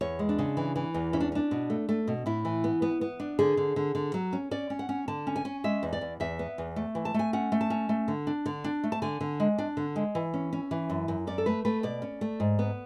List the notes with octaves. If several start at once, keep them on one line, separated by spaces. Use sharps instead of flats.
E2 C#5
G#3
D4
C#3
E3
E3
E2
C#4 E4
D4
C#4 D4
B2
A3
A3
B2
A2 E4
E3
B3
B3
B3
D4
D3 G#4
D3
D3
D3
F#3
C#4
C#4 D5
C#4
F#5
C#4
D3 A5
C#4
G#5
C#4
G#3 E5
E2
D5
E2
E2 E5
B3
E2
A3
E3
A5
A3 G#5
C#4 F#5
A3
A5
C#4
A3
D3
D4
D3
D4
A3
A5
D3 G#5
D3
G#3
D4
D3
G#3
E3
C#4
C#4
E3
F#2
F#2
C#4 D5
A4
A3 B4
A3 B4
B2 D5
C#4
A3
G#2
B3